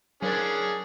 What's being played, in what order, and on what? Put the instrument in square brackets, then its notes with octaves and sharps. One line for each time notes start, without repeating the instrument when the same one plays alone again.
[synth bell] F#3 A#4 A6 [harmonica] C#4 D4 G#4